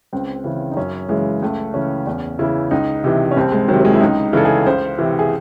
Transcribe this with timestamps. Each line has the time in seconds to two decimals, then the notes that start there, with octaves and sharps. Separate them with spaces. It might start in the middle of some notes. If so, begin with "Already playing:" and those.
0.13 C#2 C4
0.44 C#3 E3
0.72 D#4
0.77 F#2 C#4
1.09 C#3 E3 G#3
1.42 C#2 A3
1.74 C#3 E3 C#4
2.07 E2 C#4
2.39 C#3 E3 E4
2.71 C#2 D#4
3.04 C3 E3
3.31 C#4
3.36 C2 C4
3.52 G#3
3.68 D#3 F#3
3.73 C3
3.80 F#3
3.85 G#3
3.93 E4
4.01 C#2 D#4
4.33 C#3 E3 A4
4.45 G#4
4.66 C#2 C5
4.99 C3 E3
5.19 G#4